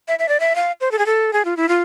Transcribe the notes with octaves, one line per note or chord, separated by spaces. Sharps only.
E5
E5
D5
E5
F5
C5
A4
G#4
A4
G#4
F4
E4
F4